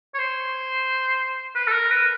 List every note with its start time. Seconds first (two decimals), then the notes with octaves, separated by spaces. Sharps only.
0.14 C#5
0.19 C5
1.55 B4
1.67 A4
1.72 A#4
1.91 B4